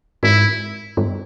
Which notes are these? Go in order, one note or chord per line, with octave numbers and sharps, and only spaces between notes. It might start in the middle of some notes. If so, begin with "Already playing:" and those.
G#2 E4
G2